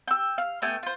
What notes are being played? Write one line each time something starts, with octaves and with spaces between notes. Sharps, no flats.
G5 E6
F5
A3 B3 G5 G#5
F4 C5